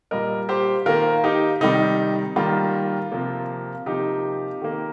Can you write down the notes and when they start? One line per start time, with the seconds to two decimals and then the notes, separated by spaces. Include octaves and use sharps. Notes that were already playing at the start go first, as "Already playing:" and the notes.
0.11 A#2 G3 A#3 A#4 D#5
0.49 G4 C5
0.86 D#3 A#3 F4 A#4
1.24 D#4 G4
1.61 C3 D#3 G3 D#4
2.36 D#3 G3 A#3 F4
3.12 C3 F3 A#3
3.86 C3 F3 A#3 D#4 G4
4.61 D#3 A#3